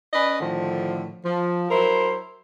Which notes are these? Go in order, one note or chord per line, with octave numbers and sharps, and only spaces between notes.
C#4 B4 D5 D#5
A2 D3 D#3 F3
F3
F#3 E4 A#4 C5